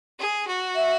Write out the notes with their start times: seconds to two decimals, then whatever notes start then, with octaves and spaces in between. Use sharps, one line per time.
0.18 G#4
0.47 F#4
0.76 E5